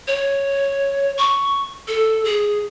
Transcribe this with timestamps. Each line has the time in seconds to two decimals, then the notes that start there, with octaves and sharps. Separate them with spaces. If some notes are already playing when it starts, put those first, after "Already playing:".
0.08 C#5
1.18 C#6
1.88 A4
2.25 G#4